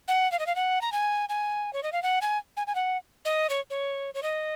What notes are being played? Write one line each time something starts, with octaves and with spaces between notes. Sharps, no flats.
F#5
F5
D#5
F5
F#5
A#5
G#5
G#5
C#5
D#5
F5
F#5
G#5
G#5
G#5
F#5
D#5
C#5
C#5
C#5
D#5